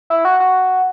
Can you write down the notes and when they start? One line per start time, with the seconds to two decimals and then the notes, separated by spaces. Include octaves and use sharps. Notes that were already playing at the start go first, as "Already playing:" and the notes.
0.10 E4
0.25 F#4
0.40 F#4